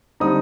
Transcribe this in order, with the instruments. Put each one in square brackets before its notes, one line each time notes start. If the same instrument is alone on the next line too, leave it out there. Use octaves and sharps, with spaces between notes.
[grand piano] D3 G3 C4 D#4 D#6